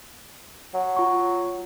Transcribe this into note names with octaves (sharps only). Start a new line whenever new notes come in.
F#3
F4 C#6